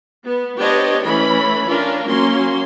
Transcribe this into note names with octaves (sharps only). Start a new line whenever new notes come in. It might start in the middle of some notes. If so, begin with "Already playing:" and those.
B3
B3 D4 G4 C5 C#5 D#5
E3 A3 C#4 B5
C#4 D4 F4 A#4
F#3 A#3 C#4 C6